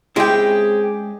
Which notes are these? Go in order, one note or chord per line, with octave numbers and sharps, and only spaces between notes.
G#3 C4 C#4 E4 G4 G#4 G5